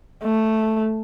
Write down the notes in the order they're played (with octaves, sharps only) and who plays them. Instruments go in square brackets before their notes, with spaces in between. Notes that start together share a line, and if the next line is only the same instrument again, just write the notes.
[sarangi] A3